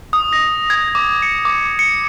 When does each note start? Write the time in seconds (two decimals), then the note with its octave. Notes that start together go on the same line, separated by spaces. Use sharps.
0.13 D#6
0.33 A#6
0.70 G#6
0.95 D6
1.22 C#7
1.45 D6
1.79 C#7